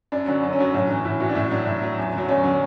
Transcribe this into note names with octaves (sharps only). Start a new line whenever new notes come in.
F#2 D4
D3 F#3 C#4
F#2
C#4
D3 F#3
A2 C#4
E3
A2 E4
E3 F#4
D4
A2 E4
F#3 D4
A2
F#3
E2
D3 F#3
E2 C#4
D3 F#3